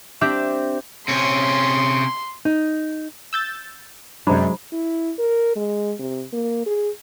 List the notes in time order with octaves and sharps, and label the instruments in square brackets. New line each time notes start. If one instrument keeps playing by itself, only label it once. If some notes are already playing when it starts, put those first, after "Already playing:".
[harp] C4 D4 G4 E5
[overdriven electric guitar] C3 C#4 [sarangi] C6
[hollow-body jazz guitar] D#4
[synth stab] E6 G6 A6
[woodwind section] F#2 [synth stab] C3 D4 [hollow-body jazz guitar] F#3 G#3 [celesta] C5 A#5 B5
[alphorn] E4
A#4
G#3
C3
A#3
G#4